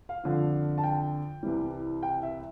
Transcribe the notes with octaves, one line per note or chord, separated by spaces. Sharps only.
F5
F2 D3 F3
A5
G5
C2 C3 E3 G3
G5
E5